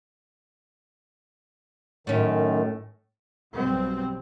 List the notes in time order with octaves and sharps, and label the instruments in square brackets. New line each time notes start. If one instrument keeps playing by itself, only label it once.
[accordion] F#2 D#3 [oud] A2 C#4
[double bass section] B1 B2 G3 C4